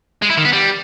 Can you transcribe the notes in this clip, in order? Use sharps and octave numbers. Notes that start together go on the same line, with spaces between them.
G#3
E4
D#3
B3
G3